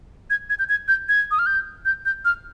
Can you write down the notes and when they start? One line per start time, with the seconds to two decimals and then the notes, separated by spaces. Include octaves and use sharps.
0.30 G#6
0.50 G#6
0.59 G6
0.69 G#6
0.88 G6
1.09 G#6
1.31 D#6
1.39 F6
1.46 G6
1.85 G6
2.05 G6
2.25 F6